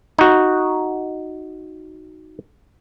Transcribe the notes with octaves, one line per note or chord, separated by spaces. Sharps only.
D#4 F#4